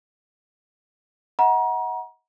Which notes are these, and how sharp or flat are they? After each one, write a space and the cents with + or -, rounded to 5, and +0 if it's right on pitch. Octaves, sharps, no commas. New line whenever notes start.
D#5 +40 F#5 +0 A#5 +35